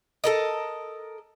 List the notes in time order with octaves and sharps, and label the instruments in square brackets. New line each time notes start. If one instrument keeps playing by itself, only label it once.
[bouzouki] A4 A#4 D#5